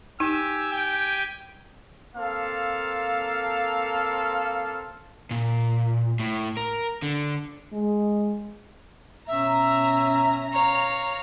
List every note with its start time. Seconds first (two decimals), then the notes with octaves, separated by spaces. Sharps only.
0.20 D#4 G4 G#5 E6
0.72 G5
2.15 A#3 C4 A4 F5
5.31 A#2
6.20 A2
6.57 A#4
7.02 D3
7.73 G#3
9.28 B2 C#4 E5 A#5
10.53 C#5 F5